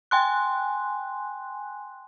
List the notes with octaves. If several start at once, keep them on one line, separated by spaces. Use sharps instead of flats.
G5 G#5 C6 F#6